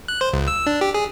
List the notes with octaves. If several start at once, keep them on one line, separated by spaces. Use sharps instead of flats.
F#6
C5
C#2
E6
D4
G4
G#4